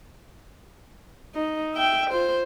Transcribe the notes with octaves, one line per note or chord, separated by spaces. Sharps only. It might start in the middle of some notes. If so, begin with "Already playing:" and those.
D#4
E5 G5
F4 C5